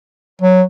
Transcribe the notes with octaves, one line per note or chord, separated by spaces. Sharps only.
F#3